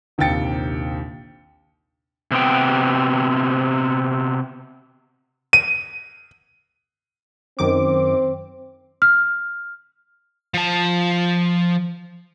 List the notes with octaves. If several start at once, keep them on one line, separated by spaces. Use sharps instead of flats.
A#1 D#2 C3 G5 A6 C#7
C3 B3 G5
D#7
F#2 D#3 C4 D6
F6
F3 A5